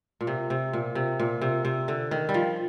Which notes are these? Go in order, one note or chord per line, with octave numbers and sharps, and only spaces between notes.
A#2
C3
C3
A#2
C3
A#2
C3
C3
D3
D#3
G3
F3